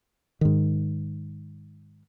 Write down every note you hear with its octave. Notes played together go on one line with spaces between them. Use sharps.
G#2 D#3